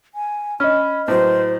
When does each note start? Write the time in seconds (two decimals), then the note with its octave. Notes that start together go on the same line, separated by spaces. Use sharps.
0.15 G#5
0.60 C#4 D#5 B5 F6
1.08 A2 F#3 B4 C5